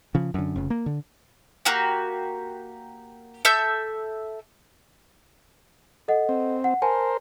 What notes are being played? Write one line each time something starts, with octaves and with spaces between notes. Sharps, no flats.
C#3 F3
F#2 D3
F1 C#3
A#3
D3
A#3 F#4 G4
A4 E5 E6 G6
A4 D#5 F#5
C4
F#5
A#4 C5 G#5 A5